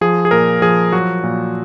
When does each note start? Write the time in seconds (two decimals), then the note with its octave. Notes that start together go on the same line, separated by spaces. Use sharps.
0.01 F3 G#4
0.25 G#4
0.31 A#2 A#4
0.62 F3 G#4
0.92 F#3 F#4
1.23 A#2